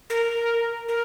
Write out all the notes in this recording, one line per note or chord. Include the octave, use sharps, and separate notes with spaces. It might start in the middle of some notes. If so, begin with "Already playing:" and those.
A#4
A#4